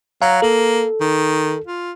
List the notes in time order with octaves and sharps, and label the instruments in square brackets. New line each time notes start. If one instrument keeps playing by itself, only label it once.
[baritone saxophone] F#3 [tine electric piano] F5 A#5
[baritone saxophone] A#3 [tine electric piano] A4
[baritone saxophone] D#3
F4